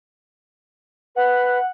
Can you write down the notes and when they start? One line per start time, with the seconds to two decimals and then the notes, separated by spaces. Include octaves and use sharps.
1.16 B4 F#5